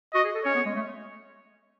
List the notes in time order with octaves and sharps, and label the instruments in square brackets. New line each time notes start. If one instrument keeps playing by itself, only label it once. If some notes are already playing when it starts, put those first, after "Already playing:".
[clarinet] F#4 [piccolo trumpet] D#5
[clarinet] G#4
A4
[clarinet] C#4 [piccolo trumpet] C#5
[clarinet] B3
G#3
A3